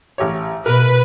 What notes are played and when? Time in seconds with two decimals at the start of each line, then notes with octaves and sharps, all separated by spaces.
0.18 A1 G4 C#5
0.66 B2 A#4 B4